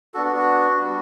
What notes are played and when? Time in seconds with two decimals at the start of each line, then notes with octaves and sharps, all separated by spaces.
0.14 B3 D4 F#4 A4
0.25 F#4
0.36 F#4
0.81 G3 B3 D4 F#4